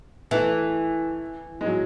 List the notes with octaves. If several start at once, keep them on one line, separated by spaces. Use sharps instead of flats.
E3 A3
G#3
F#3